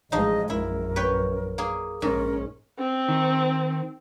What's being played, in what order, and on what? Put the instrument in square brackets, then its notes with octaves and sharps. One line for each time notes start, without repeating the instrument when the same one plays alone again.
[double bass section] A1 G#2 G#3 [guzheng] F3 D#4 [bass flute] D#5
[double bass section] A#1 F#2 [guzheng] E4 [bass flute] A#4
[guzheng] B4 C#5 G5
A#3 G#4
[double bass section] A#1 C#4 [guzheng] G#2 [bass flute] A#4
[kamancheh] C4
[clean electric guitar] D#3